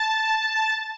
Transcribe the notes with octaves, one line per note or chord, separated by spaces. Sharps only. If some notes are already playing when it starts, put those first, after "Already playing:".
Already playing: A5